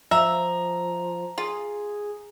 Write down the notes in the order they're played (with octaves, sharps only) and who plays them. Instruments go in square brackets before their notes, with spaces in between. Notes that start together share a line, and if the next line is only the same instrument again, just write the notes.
[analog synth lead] F3 [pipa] E5 [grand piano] A#5
[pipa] F4 [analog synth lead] G#4